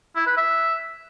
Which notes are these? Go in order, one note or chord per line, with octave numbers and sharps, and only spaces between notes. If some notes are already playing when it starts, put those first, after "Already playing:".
E4
B4
E5